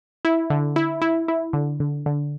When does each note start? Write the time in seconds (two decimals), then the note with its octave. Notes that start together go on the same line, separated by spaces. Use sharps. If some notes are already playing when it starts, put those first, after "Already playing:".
0.25 E4
0.50 D3
0.76 E4
1.02 E4
1.28 E4
1.53 D3
1.80 D3
2.06 D3